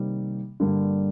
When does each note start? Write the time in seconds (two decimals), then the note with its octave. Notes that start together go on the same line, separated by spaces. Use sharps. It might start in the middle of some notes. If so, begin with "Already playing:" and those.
Already playing: C3 D#3 G3 A#3
0.60 G2 D3 G3 A#3